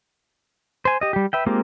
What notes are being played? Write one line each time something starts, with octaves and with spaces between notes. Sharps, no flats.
C5 G#5
G4 D#5
G3 G4
B4 E5 G5
G#3 A#3 C4 F4 G4